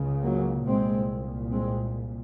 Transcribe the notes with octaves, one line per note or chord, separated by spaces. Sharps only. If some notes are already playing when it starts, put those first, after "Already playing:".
Already playing: C#2 C#3
F#3 A#3
C2 A#2 G#3 C4
G#3 C4